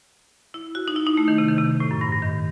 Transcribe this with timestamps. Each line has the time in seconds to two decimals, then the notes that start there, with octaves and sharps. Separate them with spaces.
0.54 E4
0.75 F#4
0.88 D#4
0.96 E4
1.06 D#4
1.17 A3
1.28 D#3
1.38 C3
1.48 D#3
1.58 C3
1.80 A2
1.91 F#2
2.01 G2
2.12 G2
2.23 D#3